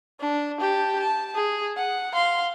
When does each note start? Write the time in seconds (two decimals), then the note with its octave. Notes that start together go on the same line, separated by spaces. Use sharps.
0.20 D4
0.61 G4 A5
1.01 A5
1.35 G#4
1.78 F#5
2.13 F5 C6